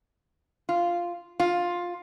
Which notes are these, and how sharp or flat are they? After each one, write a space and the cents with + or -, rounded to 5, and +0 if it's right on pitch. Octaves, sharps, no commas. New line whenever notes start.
F4 -5
F4 +10